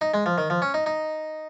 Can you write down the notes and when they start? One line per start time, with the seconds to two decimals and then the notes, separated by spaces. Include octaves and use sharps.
0.01 D#4
0.14 G#3
0.26 F3
0.38 D#3
0.50 F3
0.62 C#4
0.74 D#4
0.86 D#4